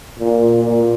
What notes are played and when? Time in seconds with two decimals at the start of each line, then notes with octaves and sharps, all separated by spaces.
0.19 A#2
0.64 A#2